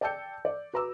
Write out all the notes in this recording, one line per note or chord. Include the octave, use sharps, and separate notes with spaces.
D5 G5 A5 E6 G6 C#7
D5
F#4 B4 A#5 D6 E6